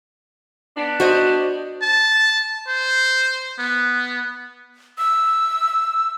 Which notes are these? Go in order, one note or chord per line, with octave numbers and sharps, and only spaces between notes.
B3 D4
F#4 C5 D#5
A5
C5
B3
E6